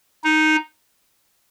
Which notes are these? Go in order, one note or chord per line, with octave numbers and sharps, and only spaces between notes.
D#4